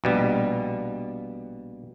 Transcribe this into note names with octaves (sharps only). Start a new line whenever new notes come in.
A#1 B2 G3